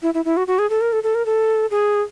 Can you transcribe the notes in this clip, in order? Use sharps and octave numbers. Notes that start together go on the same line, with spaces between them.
E4
E4
E4
F#4
F#4
G#4
A4
A#4
A4
A4
A#4
A4
G#4